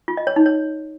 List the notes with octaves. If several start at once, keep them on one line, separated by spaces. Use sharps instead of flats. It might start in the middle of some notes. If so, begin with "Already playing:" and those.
F4
D#5
C#5
D#4
C#5